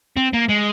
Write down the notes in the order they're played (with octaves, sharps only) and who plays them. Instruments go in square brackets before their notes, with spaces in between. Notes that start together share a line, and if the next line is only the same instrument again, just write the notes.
[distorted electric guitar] C4
A#3
G#3